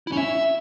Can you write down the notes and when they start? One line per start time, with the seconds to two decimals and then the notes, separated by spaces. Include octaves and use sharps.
0.07 E4
0.12 C#4
0.17 E5